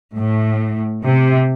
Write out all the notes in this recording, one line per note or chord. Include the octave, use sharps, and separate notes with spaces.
A2
C3